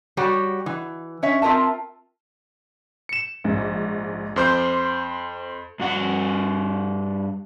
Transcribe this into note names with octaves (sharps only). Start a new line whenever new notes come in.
G3 F#4 G4 C#5
E3
C#4 C#5 E5
C4 F4 A#4 E5 A5
C#7 E7
A#1 G#2
F2 C5 C6 D6 F6 G6
G2 F#4 F#5